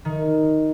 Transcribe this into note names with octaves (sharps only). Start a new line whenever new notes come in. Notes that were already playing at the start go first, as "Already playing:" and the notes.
D#3